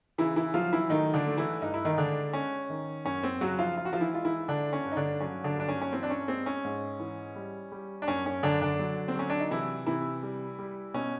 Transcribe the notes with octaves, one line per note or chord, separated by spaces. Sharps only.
C#3 E3 E4
E3 E4
F3 F#3 F4
E3 E4
D#3 A3 D#4
D3 D4
A3
E3 E4
G2 D#4
E4
D#3 D#4
D3 G#3 D4
G#3 C#4
D#3
F#2 C#4
C4
C#3 F#3 F#4
F3 F4
F3 F4
F#4
F3 F4
E3 E4
G#3 F4
E3 E4
D3 D4
C#4
G2
D#4
D3 D4
F#3 C#4
D3 D4
G2 D4
C#4
C#4
E3 C4
D4
C#4
G#3 C4
C#4
G#2
E3
G3
G3
D4
F#2 C#4
C#4
F#2 D3 D4
D3 D4
F#3
C4
F#3 C#4
D4
D#4
C3 E3 E4
C3 E3 E4
G3
G3
B2 C#4